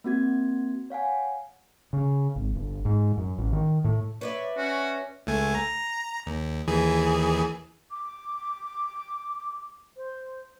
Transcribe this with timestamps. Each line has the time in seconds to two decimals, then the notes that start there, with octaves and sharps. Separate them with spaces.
0.04 A#3 C4 F#4 G#6
0.90 C#5 F5 F#5 G#5
1.93 C#3
2.36 G#1
2.55 G1
2.85 G#2
3.18 F#2
3.38 A1
3.52 D#3
3.84 A2
4.21 B4 C#5 D5 E5
4.57 C#4 F#4
5.27 C#2 A3 G#5
5.55 A#5
6.27 D#2
6.68 D#2 E3 G#4
7.90 D6
9.97 C5